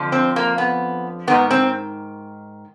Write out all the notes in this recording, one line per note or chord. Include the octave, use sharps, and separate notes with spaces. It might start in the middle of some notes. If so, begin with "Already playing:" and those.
Already playing: F2 D3 F3
C4
A#3
B3
G#2 D#3 B3
C4